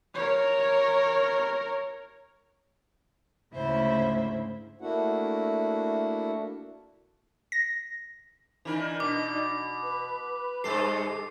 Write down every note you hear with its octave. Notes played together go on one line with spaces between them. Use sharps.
A#4 C#5
D2 G#2 C#3 E4 C5 E5
A3 A#3 D4 E4 F#4 F#5
A#6
E3 D4 D#4 A#4 G6
B2 D6
B4
G2 G#3 A4 C7